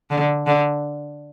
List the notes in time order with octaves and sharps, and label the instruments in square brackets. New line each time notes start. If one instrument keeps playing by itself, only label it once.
[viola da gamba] D3
D3